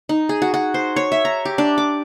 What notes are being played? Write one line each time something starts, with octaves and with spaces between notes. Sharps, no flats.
D#4
G#4
F#4
F#4
C5
C#5
E5
A#5
G4
D4
D6